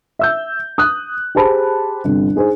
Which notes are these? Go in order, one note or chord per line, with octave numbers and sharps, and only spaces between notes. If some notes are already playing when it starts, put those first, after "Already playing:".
E5 E6 G6
D#6 F#6
G4 G#4 C5 A5 B5
G1 C3
D#4 G#4 C5